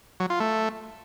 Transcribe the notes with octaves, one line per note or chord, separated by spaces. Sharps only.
F#3
F4
A3